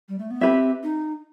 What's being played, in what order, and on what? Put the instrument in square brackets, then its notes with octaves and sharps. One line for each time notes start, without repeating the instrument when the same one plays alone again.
[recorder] G3
A3
B3
[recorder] C4 [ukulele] G4 B4 E5
[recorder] D#4